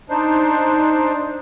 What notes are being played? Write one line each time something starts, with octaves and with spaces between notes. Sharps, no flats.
D4 D#4 C5